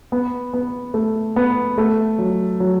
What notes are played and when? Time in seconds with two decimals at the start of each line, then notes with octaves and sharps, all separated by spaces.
0.12 B3
0.53 B3
0.94 A3
1.36 B3
1.78 A3
2.18 F#3
2.60 F#3